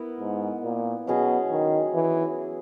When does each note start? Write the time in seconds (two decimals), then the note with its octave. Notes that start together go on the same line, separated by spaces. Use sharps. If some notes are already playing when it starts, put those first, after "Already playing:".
Already playing: B3 E4 A#4
0.20 G#2
0.63 A#2
1.07 B2 F#3 C#4 G#4
1.51 D#3
1.94 E3